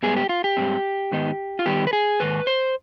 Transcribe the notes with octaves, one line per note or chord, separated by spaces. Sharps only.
G#2 G3 B3 G#4
G4
F4
G4
G#2 G3 C4
G#2 D#3 B3 D#4
F4
D#3 G3 B3 G4
B4
G#4
G#2 D#3 B4
C5